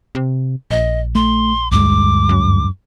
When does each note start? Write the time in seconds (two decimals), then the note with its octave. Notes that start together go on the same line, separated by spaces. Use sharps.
0.15 C3
0.71 A#1 D#5
1.15 A3 C6
1.71 D2 G2 G#3 D6
2.29 F#2